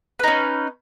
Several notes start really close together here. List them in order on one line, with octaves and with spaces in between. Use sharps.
B4 D#4 C#4